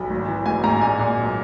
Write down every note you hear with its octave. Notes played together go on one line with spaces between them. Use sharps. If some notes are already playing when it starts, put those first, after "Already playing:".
Already playing: B1 B5
G#1
E3
G#2 G#5
G#2 A#5
A#2 G#5
A#2
B1